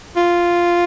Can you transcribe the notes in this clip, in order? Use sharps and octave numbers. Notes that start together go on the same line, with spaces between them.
F4